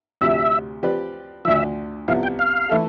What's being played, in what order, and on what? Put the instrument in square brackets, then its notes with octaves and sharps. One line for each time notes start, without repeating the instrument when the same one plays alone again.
[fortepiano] D2 C3 F3 [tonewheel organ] E5
[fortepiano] F3 C4 G4 B4 D5
[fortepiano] D2 D3 F3 [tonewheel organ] E5
[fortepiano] C2 C3 F3 B3 E4 [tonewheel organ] F5
[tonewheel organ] G5
F5
[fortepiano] E3 A3 E4 A4